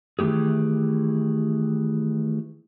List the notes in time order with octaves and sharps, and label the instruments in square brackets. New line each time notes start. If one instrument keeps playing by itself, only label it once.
[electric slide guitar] D#3 E3 A3 G4 G#4